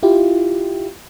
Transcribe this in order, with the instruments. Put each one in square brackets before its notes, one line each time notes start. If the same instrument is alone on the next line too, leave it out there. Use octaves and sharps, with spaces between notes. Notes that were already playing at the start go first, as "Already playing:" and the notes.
[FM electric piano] E4 F4 G4